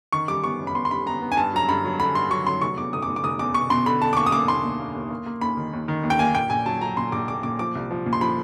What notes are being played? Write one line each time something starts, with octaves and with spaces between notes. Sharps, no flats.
D#3 C#6
G3 D6
B3 C#6
F#2
B5
B3 C6
C6
G3 B5
B3 A#5
B3
G#5
G2 A5
F#3 A#5
G2 B5
F#3
D3 B5
G2 C6
F#3 C#6
F#3 C6
F1 C#6
E2 D6
F1 D#6
D6
F1
D6
F1 D#6
E2 D6
B2 C#6
B2 C6
D3 B5
D3 A5
D6
A#3 C#6
D#6
A#3 D6
D#2 C6
D#2
A#3
D#2
A#3
A#3
D#2 B5
D#3
D#2
D#3
D#2
G5
A#3 G#5
A#2 G5
A#1 G#5
F#3 A5
F#3 A#5
A#2 C6
A#1 D6
A#2 D6
A#2 D6
F3 D6
C2
F3
A#2
C6
F3 B5